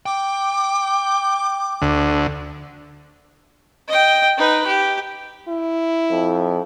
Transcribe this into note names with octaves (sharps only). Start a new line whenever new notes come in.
G5 D6
D2
D#5 G5
D#4 B4
G4
E4
F2